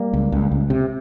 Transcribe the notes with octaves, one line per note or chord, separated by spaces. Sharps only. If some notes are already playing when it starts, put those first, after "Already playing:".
Already playing: G3 A#3
C#2
C#2
C#2
C3